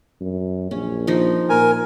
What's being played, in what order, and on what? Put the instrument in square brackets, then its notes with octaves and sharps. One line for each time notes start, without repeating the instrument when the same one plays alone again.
[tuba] F#2
[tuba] A#1 [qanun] C#4
[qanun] F3 D#4
[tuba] A#2 [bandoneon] A#4 G#5